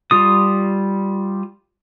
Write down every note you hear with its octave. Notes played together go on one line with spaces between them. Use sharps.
G3 F4 D#6